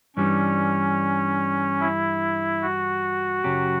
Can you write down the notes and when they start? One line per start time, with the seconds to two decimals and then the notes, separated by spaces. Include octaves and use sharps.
0.16 G2 E3 G3 C#4 D4
1.80 E4
2.62 F#4
3.44 F#2 C#3 F#3 C#4 G4